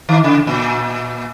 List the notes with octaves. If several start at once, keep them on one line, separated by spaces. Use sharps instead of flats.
D#3
C#3
A#2